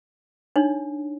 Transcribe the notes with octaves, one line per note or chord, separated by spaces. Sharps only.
D4 D#4 C#5